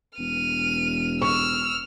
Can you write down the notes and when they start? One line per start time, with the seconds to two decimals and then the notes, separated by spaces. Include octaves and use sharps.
0.19 E1 F6 D#7
1.22 C#6 E6 F6